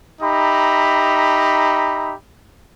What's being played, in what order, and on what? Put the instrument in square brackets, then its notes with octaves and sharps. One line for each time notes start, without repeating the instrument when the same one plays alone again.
[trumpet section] D#4 G4 E5 A#5 B5